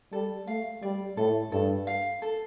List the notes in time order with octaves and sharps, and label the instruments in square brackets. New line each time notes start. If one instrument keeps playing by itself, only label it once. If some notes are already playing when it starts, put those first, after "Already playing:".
[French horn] G3 [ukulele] A4
[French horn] A3 [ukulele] F5
[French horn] G3 [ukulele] D5
[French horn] A2 [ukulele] A4
[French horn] G2 [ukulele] A4
[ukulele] F5
A4